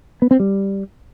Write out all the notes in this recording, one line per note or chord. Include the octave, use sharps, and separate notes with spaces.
B3
C4
G3